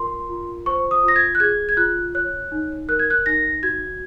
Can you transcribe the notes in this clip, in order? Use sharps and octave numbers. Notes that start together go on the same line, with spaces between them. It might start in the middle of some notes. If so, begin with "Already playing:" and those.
Already playing: F4 A#4 C6
F4
C5 C#6
D#6
F4
A#6
G#6
F#6
G#4 G#6
G#6
F4 F#6
C#5 F#6
D#4
A#4 F#6
G#6
F#6
D#4 A#6
F#4 G#6